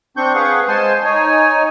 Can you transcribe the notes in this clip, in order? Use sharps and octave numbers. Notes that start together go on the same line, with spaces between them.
C4 D4 C#6 G6
G#4 B4 F5 F#5 C#6
G#3 C5 G#5 A5 C6
D#4 C#5 G#5